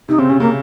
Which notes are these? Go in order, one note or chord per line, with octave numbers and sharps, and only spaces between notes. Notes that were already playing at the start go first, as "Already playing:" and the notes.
C3 D#4
C#3 C4
C3 C#4
C#3 A#3